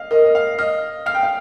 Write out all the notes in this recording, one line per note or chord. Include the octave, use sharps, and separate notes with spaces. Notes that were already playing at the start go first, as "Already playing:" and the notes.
Already playing: D#5 F5
A#4 D#5
D#5
F5
D#5 F6
F5 F6
G5
F5